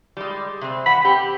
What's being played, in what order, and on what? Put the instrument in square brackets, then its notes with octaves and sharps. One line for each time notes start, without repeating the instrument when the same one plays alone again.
[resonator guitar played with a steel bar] G3 G#3
C3 C4
[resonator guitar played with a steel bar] E3 F#5 [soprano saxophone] B5
[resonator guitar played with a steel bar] C4 [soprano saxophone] G4